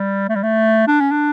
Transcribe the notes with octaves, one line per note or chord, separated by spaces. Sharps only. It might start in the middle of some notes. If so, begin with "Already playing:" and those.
Already playing: G3
A3
G3
A3
D4
C#4
D4